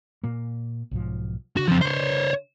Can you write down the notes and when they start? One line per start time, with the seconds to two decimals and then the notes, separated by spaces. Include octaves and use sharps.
0.23 A#2 A#3
0.91 B1 G#2 F3
1.57 C#3 D4 F#4
1.68 F3 C4
1.81 C5 C#5